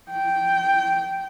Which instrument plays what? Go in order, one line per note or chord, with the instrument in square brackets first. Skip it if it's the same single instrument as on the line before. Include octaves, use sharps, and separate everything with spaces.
[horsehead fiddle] G5